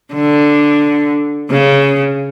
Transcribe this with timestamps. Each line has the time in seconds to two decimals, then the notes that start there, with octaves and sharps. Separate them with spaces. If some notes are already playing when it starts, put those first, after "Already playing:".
0.13 D3
1.51 C#3